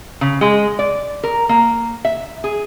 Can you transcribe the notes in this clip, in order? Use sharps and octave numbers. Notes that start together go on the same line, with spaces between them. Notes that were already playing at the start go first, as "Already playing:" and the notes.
C#3
G#3
D5
A#4
A#3
E5
G#4